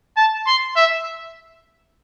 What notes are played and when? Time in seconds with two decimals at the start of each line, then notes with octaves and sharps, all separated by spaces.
0.17 A5
0.47 C6
0.76 E5